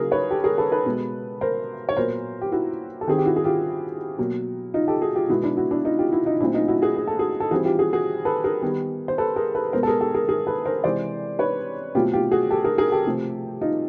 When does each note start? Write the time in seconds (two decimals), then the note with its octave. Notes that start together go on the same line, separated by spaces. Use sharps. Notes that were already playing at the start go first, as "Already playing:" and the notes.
Already playing: C#3 F#3 A#3 G#4 A#4
0.11 B4 C#5
0.30 G4 A4
0.44 G#4 A#4
0.58 A4 B4
0.72 A4 B4
0.86 B2 G#3 B3
1.41 A#4 C5
1.89 C#5
1.96 A#2 F#3 B3 A#4 C5
2.41 G4
2.52 E4 F#4
3.01 A4
3.07 D#3 G3 C4 G#4
3.18 G4
3.26 E4 F#4
3.36 G#4
3.44 F4 G4
4.18 B2 F#3 A#3
4.74 D#4 F4
4.88 G4 A4
5.02 F#4 G#4
5.16 F4 G4
5.29 B2 G#3 B3 E4 F#4
5.43 D4 E4
5.57 E4 F#4
5.71 D4 E4
5.85 D#4 F4
5.99 F4 G4
6.13 E4 F#4
6.26 D#4 F4
6.40 A#2 F#3 A3 C4 D4 E4
6.54 D#4 F4
6.68 E4 F#4
6.82 F#4 G#4
6.96 G#4
7.07 A4
7.19 F#4 G#4
7.40 A4
7.51 E3 G3 C4 F#4 G#4
7.65 F4 G4
7.79 F#4 G#4
7.93 F#4 G#4
8.25 A4 B4
8.44 G#4 A#4
8.62 D#3 G3 B3
9.08 C5
9.18 A4 B4
9.36 G#4 A#4
9.55 A4 B4
9.73 B2 G#3 B3 A#4 C5
9.83 A4
9.87 G#4 A#4
10.01 G4 A4
10.14 G#4 A#4
10.29 G#4 A#4
10.47 A4 B4
10.65 A#4 C5
10.84 C3 E3 G#3 C5 D5
11.39 B4 C#5
11.95 B2 F#3 A3 C4 F4 G4
12.13 F4 G4
12.31 F#4 G#4
12.51 G4 A4
12.64 G#4 A#4
12.78 G#4 A#4
12.92 G4 A4
13.06 C3 F3 A3 C4
13.61 D#4 F4